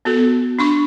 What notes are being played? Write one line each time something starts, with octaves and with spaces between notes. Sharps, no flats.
B3 F#4 A4
D4 C6 C#6